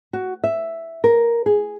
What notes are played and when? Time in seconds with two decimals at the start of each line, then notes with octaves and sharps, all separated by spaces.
0.13 F#4
0.44 E5
1.04 A#4
1.46 G#4